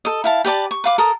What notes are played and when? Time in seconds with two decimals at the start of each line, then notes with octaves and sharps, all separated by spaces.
0.05 A4 D#5
0.24 E4 F5 A5
0.44 G4 B4 D5 A5
0.71 C#6
0.84 B4 F5 D6
0.98 A4 A#4 D#6